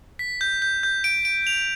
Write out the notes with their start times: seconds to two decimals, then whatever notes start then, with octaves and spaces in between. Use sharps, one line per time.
0.19 B6
0.41 G6
0.62 G6
0.83 G6
1.04 D7
1.25 D7
1.47 F7